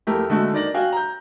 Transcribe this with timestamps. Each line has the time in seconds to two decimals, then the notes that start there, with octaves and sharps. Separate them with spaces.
0.07 F2 A3 E4 G4 A#4
0.30 D3 G#3 A3 F#4
0.53 D#3 D5 A#6 F#7
0.74 F#4 F5 G5 G#5
0.93 A#5 G6